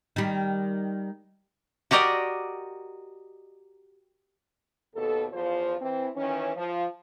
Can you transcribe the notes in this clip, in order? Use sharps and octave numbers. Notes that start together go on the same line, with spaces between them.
D#3 G3
F#4 G4 A#4 D5 D#5
D#2 B2 A4
E2 F3 F4 C5
E3 C4
D#3 E3 C#4
F3